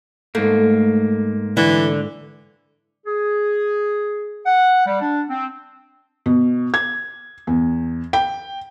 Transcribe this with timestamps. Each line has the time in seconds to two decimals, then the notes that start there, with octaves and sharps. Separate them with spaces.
0.35 G#2 A3 A#3
1.57 D3 E3
3.06 G#4
4.46 F#5
4.86 G3
5.00 D4
5.29 C4
6.26 B2
6.74 G#6
7.47 E2
8.13 G5